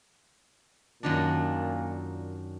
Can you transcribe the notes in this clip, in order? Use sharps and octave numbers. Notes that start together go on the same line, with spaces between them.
F#2 A#2 D#3 D4